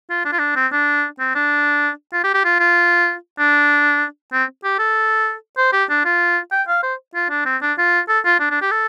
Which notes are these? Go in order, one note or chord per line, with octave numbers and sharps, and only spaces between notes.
F4
D4
F4
D4
C4
D4
C4
D4
F4
G4
G4
F4
F4
D4
C4
G4
A4
C5
G4
D4
F4
G5
F5
C5
F4
D4
C4
D4
F4
A4
F4
D4
D4
G4
A4